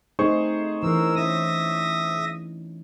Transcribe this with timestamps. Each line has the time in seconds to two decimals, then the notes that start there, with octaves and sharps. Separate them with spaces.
0.19 A3 C4 D#4 G#4 C5 C#6
0.83 E3 C#4 A#4 E6
1.15 C#4 E5 D#6 A#6